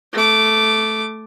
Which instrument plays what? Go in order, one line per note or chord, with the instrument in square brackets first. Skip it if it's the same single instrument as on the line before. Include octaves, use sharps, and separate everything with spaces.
[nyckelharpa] A3 D6